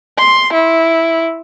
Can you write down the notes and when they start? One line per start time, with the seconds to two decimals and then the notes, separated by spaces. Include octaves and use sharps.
0.19 C6
0.54 E4